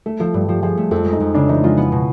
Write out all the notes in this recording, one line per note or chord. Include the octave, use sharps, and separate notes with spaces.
A3 A4
F3 A4
G2 G4
F3 G4
F3 G#4
A3
F2 A4
G#3
D#4
F2
C#3 D4
E3 D#4
G#3 F4
B3
B2